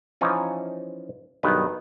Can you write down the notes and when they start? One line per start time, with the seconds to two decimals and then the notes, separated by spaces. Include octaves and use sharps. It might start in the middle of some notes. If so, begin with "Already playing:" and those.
0.21 E3 F3 C#4 D#4 F4
1.43 B1 G2 D#3 B4